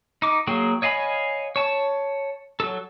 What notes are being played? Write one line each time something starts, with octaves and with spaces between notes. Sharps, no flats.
D#4 D6
F#3 A#3 F#4 G#4 G5
C#5 D#5 F5 G#5 B5
C#5 A5
F#3 A4